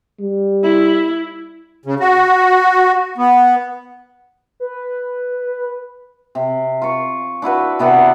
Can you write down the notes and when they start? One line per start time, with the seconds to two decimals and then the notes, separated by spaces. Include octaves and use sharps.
0.20 G3
0.64 E4
1.86 C#3
2.00 F#4
3.18 B3
4.60 B4
6.35 C3
6.82 F4 C#6
7.42 D4 E4 F#4 B4
7.79 C3 B3 D5 F#5